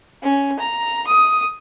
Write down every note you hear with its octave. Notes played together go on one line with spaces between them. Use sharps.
C#4
A#5
D#6